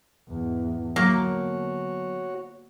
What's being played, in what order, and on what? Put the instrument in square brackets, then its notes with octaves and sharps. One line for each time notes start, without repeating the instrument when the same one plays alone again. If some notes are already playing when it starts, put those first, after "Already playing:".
[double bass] E2 G#2
[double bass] D3 B3 [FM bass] F#3 [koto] A#3 [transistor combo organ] F#4 C#5